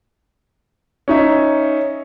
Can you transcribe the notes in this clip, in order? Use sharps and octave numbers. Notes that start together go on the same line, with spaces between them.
C#4 D#4 E5